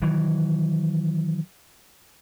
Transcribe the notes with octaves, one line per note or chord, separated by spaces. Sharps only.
D#3 E3 F#3